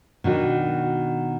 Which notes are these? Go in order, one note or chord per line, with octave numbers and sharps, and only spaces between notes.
B2 D#3 D4 F#4